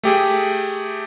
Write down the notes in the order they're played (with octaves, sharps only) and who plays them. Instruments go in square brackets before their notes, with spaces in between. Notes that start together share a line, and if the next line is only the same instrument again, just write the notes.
[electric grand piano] A3 G4 G#4